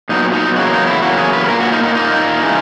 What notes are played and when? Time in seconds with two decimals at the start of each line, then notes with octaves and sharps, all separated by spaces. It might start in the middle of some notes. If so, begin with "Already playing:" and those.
0.09 A#2 F#3 B3 D#4
0.33 D#4
0.56 E2 C#3 F#3 A#3 F#4
0.72 D#4
0.87 E4
1.02 E2 C#3 F#3 A#3 F#4
1.13 F#4
1.18 G#4
1.33 B4
1.44 B4
1.48 A#2 A#3 A#4
1.60 F#4
1.67 C#4
1.72 D#4
1.84 D#4
1.95 A#2 A#3 D#4
2.42 C#3 E3